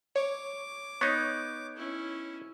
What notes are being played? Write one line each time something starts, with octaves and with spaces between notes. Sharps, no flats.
C#5 D6
B3 D#4 C#5
C#4 E4